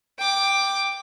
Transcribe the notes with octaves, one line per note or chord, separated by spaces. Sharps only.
G5 D6